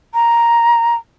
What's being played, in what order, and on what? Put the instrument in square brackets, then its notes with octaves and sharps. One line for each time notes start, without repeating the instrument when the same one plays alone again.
[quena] A#5